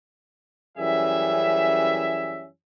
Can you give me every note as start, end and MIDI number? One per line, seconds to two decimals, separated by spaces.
0.78 2.48 42
0.78 2.48 52
0.78 2.48 55
0.78 2.48 61
0.78 2.48 68
0.78 2.48 76